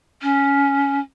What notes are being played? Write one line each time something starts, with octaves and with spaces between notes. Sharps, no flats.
C#4